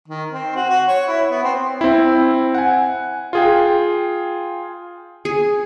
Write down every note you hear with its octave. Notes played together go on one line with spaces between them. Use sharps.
D#3
C4
F#4
F#4
C#5
E4
B3
C4
C4 E4
F#5 G#5
F4 G#4 G5
G#4